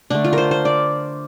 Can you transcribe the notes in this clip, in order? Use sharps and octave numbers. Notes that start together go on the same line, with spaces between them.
D3 A3 D4
F4
A#4 C5
C5
D5